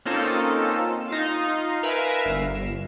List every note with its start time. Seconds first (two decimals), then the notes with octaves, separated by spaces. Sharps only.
0.05 A#3 C4 C#4 D#4 F4 A4
0.86 E7
1.08 D#4 F4 F5
1.83 A#4 B4 E5 F5 G#5
2.25 G1 C7 E7